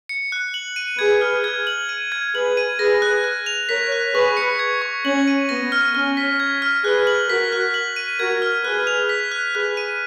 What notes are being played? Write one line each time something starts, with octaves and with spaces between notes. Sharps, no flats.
C#7
F#6
F#7
D#7
G#4 B4 G#6
F6
G#6
F#7
D#7
G#6
G#4 B4 F#7
D#7
G#4 B4 A#6
F#6
F#6
F7
A#4 C#5 B6
F#6
G#4 B4 C#6
C#7
G#6
C#6
C#4 F#7
D#7
B3 A#6
F6
C#4 F6
B6
G#6
F6
G#4 B4 F#6
F#7
F#4 A#4 B6
F#6
F#7
D#7
F#4 A#4 G#6
F6
G#4 B4 F#6
F7
B6
F#6
G#4 B4 F#6
D#7